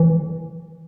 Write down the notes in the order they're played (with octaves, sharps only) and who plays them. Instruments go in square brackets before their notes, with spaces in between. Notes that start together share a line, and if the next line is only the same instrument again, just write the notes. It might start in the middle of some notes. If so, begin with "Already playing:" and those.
Already playing: [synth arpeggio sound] E3